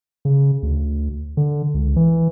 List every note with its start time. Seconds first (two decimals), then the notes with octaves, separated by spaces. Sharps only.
0.25 C#3
0.63 D2
1.37 D3
1.74 C#2
1.96 E3